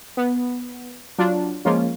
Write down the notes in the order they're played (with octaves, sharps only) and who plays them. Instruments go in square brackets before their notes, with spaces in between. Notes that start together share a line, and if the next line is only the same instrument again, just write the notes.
[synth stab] B3
F#3 D4 F4
F3 G#3 A#3 C#4 F4